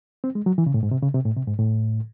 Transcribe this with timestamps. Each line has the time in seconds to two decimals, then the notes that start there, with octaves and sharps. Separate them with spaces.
0.24 C4
0.35 G#3
0.46 F#3
0.58 E3
0.66 C#3
0.74 A2
0.83 G#2
0.91 C3
1.02 C#3
1.14 C3
1.25 A2
1.36 C3
1.48 G#2
1.59 A2